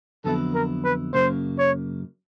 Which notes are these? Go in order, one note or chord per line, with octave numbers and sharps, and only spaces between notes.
F2 D3 F#3 B3 E4 A4
A#4
B4
F#2 C#3 F#3 A#3 C5
C#5